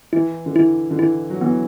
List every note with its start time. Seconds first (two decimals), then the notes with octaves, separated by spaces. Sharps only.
0.13 E3 E4
0.46 D3
0.55 E3 E4
0.91 D3
0.98 E3 E4
1.30 F#3
1.41 E3 B3